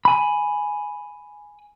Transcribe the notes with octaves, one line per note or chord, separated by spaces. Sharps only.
G#5 B5